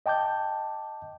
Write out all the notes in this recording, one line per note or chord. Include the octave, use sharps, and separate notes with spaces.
D#5 G5 A5 D6 G6